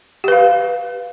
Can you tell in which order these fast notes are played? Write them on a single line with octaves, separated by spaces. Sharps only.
G4 B4 F5